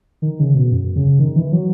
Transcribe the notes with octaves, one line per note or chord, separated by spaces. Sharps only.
D#3
C#3
B2
F#2
C#3
D#3
E3
F#3